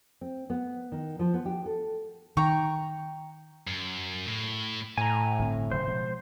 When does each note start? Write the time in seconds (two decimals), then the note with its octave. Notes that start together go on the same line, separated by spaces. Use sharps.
0.21 C4
0.50 B3
0.92 D#3
1.19 F3
1.34 B3
1.46 G4
1.66 A4
2.37 D#3 G5 A#5 C#6
3.67 F#2
4.26 A2
4.98 A2 G#5 A#5
5.39 G1 D3 C4
5.71 D1 C#3 F#3 C5
5.87 B2 F3 G#3